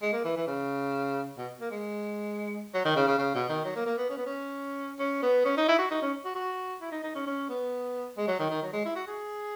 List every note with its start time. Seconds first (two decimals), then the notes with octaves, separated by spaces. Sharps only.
0.02 G#3
0.13 A#3
0.25 E3
0.36 E3
0.47 C#3
1.37 B2
1.61 A#3
1.71 G#3
2.74 F#3
2.85 D#3
2.96 C#3
3.07 C#3
3.18 C#3
3.34 B2
3.49 D#3
3.65 F#3
3.76 A#3
3.86 A#3
3.98 B3
4.10 C#4
4.17 B3
4.26 C#4
4.99 C#4
5.22 B3
5.45 C#4
5.57 D#4
5.68 E4
5.78 F#4
5.91 D#4
6.02 C#4
6.24 F#4
6.35 F#4
6.81 E4
6.92 D#4
7.04 D#4
7.15 C#4
7.26 C#4
7.49 B3
8.17 G#3
8.27 F#3
8.39 D#3
8.50 D#3
8.62 F#3
8.73 G#3
8.85 E4
8.95 F#4
9.07 G#4